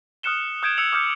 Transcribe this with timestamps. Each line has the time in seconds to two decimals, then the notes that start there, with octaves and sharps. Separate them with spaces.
0.23 D#6 F6 F#6 C#7 E7 G7
0.63 D#6 G6 G#6 D7 E7
0.77 E6 C#7 F7 F#7
0.92 D6 D#6 F6 G6 C#7